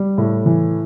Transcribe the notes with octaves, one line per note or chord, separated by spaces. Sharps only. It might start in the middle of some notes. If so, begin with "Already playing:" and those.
Already playing: G3
A2
E3